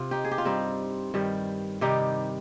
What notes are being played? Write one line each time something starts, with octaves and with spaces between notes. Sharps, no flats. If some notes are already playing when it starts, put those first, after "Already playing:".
Already playing: C3 F4
D#4 G4
G#4
G4
F4
G2 G3 C4 D#4
G2 D#3 G3
C3 D#3 G3 D#4 G4